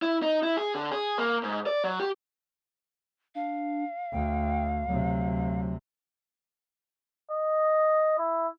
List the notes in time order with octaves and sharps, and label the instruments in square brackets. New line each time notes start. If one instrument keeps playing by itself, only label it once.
[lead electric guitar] E4
D#4
E4
G#4
D3
G#4
A#3
G#2
D5
F#3
G4
[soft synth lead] D4 [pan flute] F5
[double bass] D2 [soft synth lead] G5
[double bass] D2 C3 [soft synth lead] F#3
[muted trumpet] D#5
E4